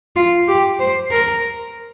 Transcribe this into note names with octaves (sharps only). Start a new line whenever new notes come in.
F4
G4
C5
A#4